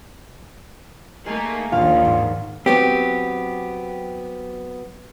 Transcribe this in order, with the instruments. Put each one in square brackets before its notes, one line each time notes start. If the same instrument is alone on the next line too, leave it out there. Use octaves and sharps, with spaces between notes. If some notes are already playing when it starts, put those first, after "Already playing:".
[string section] A3 A#3 D#4 [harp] G#4
[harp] A#1 F5 [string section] D#2 [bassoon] F4
[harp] G#2
[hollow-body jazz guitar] F#3 B3 C4 [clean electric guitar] G4